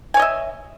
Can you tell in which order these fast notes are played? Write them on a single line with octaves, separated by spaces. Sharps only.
G#5 C#5 D#5 E5